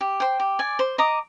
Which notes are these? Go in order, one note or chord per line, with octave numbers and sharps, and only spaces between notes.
G4
C5 G5
G4
D5 G#5
C5
D#5 A#5 D6